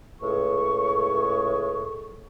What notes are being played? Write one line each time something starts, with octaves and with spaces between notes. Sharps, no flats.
C#2 A2 G#4 C#6